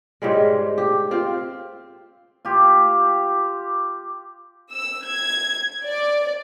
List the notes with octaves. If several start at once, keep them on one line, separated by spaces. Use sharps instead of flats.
G#2 C#3 G3 G#3
G4
C4 F4 C5
F4 G4
E6
G#6
D5